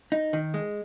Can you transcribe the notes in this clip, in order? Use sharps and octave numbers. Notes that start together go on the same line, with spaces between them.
D#4
D#3
G#3